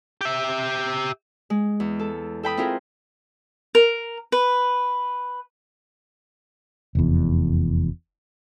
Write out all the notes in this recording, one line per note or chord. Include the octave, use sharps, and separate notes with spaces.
G4 E5
G#3
E2
A4
A4 G5 B5 D#6
C4 E4 F4 G#4 A#4
A#4
B4
F1 E2